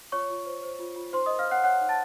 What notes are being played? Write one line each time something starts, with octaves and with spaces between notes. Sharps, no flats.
F4 C#5 C#6
F4
C5
C5
F4
F4
D#4 C5 C6
A#4 D#5 D#6
F5 F6
C#5 F#5 F#6
C#5 F#5 F#6
D#4
A5 A6